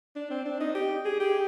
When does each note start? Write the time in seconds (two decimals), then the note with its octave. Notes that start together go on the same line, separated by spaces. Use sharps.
0.16 D4
0.30 C4
0.45 D4
0.60 D#4
0.75 G4
1.05 G#4
1.20 G4